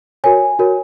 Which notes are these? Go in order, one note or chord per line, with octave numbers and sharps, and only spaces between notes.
F#4 A#4 C#5 G#5
F#4 A#4 C#5